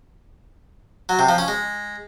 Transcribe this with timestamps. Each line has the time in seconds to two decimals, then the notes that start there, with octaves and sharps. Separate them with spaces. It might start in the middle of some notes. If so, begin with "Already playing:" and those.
1.09 F#3
1.19 C3
1.29 F3
1.38 C#4
1.48 G#3